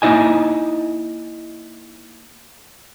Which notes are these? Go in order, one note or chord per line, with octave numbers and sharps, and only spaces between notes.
A#3 D#4 E4 D#5 G#5